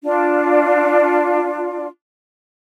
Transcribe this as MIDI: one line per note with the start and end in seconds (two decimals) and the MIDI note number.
0.03 1.87 62
0.03 1.87 65